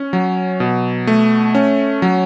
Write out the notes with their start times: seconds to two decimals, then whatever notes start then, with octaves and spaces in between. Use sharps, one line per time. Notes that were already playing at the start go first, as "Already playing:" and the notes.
Already playing: C#4
0.13 F#3
0.60 B2
1.07 A3
1.55 C#4
2.02 F#3